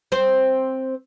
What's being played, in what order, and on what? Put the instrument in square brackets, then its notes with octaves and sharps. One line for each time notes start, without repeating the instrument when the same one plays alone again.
[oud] C4 C5